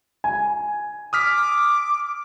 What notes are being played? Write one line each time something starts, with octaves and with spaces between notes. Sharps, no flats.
G#5
D6 D#6 F6 B6